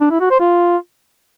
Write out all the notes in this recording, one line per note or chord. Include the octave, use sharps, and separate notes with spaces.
D4
E4
F#4
C5
F4